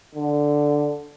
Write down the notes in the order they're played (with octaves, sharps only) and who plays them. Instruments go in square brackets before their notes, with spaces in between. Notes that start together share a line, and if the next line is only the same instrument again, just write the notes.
[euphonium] D3